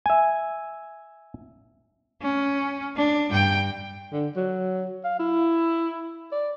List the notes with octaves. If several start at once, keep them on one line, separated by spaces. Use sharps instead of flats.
E5 G#5
C#4
D4
G2 G5
D3
F#3
F5
E4
D5